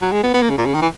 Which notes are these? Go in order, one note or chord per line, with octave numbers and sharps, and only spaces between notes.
F#3
G#3
B3
B3
A#3
C#3
A#2
C#3
D#3
E3